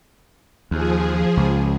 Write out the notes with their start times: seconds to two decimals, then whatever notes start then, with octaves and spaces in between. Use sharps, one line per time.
0.71 D#2 F3 G#4
1.37 C#2